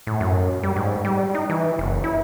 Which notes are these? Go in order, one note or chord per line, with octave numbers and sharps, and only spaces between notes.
A2
F#2
G3
G#2
G3
D#4
E3
F#1
E4